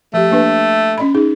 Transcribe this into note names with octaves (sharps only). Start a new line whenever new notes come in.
F3 A3 G4
A#3 D4 B4
C#4 D#5 B5
D#4 G#4